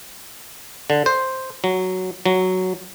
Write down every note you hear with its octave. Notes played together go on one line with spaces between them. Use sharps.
D3
C5
F#3
F#3